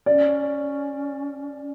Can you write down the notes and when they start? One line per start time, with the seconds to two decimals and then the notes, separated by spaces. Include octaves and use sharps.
0.06 C#4 D5